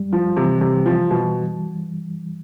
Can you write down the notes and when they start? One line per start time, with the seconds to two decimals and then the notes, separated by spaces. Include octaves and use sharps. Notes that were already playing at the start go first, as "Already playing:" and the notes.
Already playing: G3
0.13 F3
0.37 C3 E3
0.61 C3
0.86 F3
1.11 B2